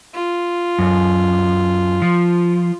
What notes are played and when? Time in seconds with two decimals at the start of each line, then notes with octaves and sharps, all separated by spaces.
0.14 F4
0.79 F#2
2.02 F3